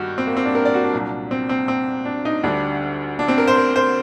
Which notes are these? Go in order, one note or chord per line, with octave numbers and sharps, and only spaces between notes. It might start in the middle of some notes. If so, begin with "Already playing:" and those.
Already playing: G2 D#3 G3 F#4 G4
C4
A#3
C4
D4
A#4
D5
F#4
D4
C2 A#2 F#3
C4
C4
C4
D4
D#4
D2 D3 G3 D4
D4
C4
A#4
C5
A#4
C5